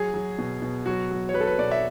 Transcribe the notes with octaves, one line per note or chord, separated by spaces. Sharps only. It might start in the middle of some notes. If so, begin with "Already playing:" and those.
Already playing: F#3 G#4
F#3
B2
B2
F#3 F#4
F#3
C#5
F#3 B4
A4
B4
B2 D5
E5